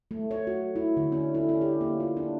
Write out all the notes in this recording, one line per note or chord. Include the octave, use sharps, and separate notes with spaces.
A3
C#5
F#4
E4
D3
C#4
E4
C#4
G4
A#3
F4
D4